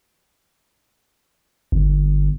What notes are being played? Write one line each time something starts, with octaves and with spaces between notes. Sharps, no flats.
G1